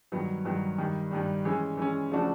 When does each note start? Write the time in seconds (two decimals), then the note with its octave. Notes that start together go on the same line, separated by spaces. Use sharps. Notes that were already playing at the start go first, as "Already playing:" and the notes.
0.12 G2 D#3 F#3 B3
0.45 G2 D#3 F#3 B3
0.78 G2 D#3 G3
1.11 G2 D#3 G3
1.45 E3 G#3 C#4
1.77 E3 G#3 C#4
2.11 C#3 F3 A3 D4 F#4